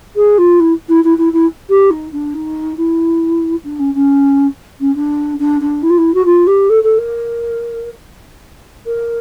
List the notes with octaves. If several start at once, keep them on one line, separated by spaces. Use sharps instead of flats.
G#4
F4
E4
E4
E4
E4
E4
G4
D#4
D4
D#4
E4
D4
C#4
C#4
C#4
D4
D4
D4
E4
F4
E4
F#4
F4
G4
A4
A4
A#4
A#4